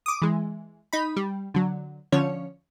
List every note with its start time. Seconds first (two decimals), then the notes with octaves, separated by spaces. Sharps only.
0.06 D6 D#6
0.22 E3 G#3
0.93 D#4 B5
1.16 G3
1.54 D3 F#3
2.12 D3 F3 C#4 C#5